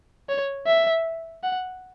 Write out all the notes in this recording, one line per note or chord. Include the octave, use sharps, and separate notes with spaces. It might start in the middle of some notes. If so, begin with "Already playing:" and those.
C#5
E5
F#5